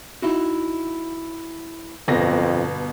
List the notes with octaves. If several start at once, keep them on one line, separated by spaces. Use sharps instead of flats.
D#4 E4 F#4
G1 F2 B2 A#6